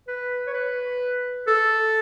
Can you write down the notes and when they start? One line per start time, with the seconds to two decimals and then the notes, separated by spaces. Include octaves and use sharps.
0.08 B4
0.47 C#5
0.54 B4
1.47 A4